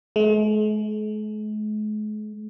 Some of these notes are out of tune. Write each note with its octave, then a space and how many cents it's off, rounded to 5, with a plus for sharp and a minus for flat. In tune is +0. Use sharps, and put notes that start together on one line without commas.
G#3 +45